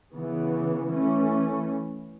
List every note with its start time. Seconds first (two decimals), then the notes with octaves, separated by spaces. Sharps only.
0.10 C#3 E3 B3
0.87 E3 A3 C#4